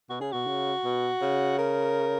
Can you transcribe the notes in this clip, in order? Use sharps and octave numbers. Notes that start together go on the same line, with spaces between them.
B2 F#4
C#3 G#4
B2 F#4
C#3
B2
C#3
A#4